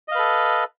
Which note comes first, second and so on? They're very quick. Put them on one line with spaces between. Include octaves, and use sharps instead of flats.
D#5 F5 B4 A4